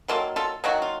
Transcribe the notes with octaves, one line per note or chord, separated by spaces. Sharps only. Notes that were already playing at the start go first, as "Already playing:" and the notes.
D#3 F#3 A#3 F4 A4
F4 A4
D#3 F#3 A#3 D#4 F#4
F4